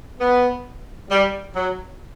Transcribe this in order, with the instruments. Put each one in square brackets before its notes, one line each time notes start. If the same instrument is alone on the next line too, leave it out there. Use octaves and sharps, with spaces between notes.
[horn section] B3
G3
F#3